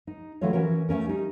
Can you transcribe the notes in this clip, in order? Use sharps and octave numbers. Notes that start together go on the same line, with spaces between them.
D#4
D3 E3 F#3 A3 F4 C#5
E3 C#4 F#4 A#4
A3 A#3 C#4 A#4
G3 D#4